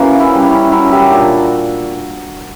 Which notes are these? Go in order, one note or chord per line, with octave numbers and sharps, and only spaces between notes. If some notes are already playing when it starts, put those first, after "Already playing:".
Already playing: C#3 E3 A#3 F#4
C#4 E4
G3
C#4 E4
F#3 C#4 E4
E4 G4
A#2 D4 F#4